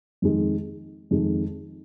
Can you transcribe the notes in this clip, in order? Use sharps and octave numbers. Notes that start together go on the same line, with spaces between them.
F2 D#3 G#3
F2 D#3 G#3